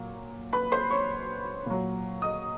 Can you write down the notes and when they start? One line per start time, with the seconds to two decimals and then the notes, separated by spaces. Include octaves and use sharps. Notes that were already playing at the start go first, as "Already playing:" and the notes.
Already playing: A#2 F#3
0.53 B4 B5
0.72 C5 C6
0.90 C#5 C#6
1.66 A#2 F#3
2.22 D#5 D#6